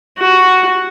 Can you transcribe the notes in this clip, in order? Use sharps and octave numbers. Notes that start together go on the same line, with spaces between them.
F#4